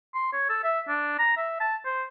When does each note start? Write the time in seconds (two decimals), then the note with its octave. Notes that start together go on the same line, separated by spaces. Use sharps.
0.14 C6
0.33 C#5
0.49 A4
0.64 E5
0.88 D4
1.19 A#5
1.37 E5
1.60 A5
1.85 C5